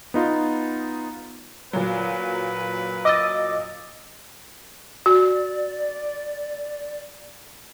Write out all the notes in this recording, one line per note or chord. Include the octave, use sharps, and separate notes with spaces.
B3 D#4 F4
A#2 F#3 B4
D#5 D6 E6 A6
F#4 D5